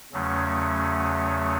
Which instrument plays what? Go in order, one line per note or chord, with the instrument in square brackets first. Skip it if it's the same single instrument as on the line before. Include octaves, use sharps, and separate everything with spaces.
[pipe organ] E2 C#3 F#3 A3 C#4